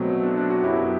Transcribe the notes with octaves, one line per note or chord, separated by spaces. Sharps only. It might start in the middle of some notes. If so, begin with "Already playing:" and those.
Already playing: B2 F#3 A3 C4
D4
D4
D4 F#4
F#2 F#3 B3 E4 G4